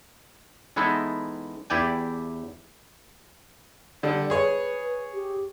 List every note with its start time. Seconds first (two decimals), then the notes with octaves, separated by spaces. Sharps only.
0.76 E3 G#3 B3 D#4 E4 A4
1.70 E2 E4 G4 D5 G5 G#5
4.03 D3 G3 D5
4.30 G#4 B4 C#5
5.14 G4